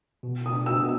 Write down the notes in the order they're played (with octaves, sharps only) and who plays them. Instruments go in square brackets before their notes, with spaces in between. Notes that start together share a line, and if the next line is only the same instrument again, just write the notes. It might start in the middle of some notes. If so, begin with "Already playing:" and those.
[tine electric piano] B2
[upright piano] D#6
[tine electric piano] D4
[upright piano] E6
[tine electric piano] B3